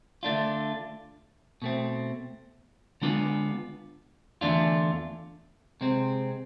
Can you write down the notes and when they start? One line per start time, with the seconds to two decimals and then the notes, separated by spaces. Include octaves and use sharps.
0.23 D3 A3 D4 F4
1.62 B2 A3 C4
3.02 D3 G#3 B3 D4 F4
4.41 E2 D3 A3 D4 F4
5.81 C3 G#3 C4